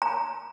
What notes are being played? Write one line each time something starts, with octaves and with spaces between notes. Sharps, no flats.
A#5